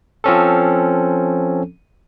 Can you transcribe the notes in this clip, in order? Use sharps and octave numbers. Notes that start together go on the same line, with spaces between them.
F3 C4 C#4 A4